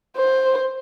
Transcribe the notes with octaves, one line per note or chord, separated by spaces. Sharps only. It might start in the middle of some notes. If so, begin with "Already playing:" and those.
C5